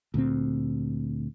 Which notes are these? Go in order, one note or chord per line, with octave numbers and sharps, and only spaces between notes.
D2 A#2 A3 C4